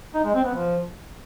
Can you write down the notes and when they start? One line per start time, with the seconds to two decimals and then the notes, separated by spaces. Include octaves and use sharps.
0.15 D#4
0.25 G#3
0.35 C4
0.45 B3
0.55 F3